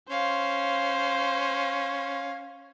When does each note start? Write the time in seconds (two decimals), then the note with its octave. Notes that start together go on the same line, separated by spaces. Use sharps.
0.10 C#4 C5 F5